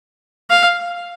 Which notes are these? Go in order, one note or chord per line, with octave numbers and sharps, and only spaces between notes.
F5